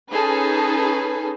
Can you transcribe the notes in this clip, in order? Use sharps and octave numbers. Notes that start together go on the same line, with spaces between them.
C#4 D#4 G#4 A4 B4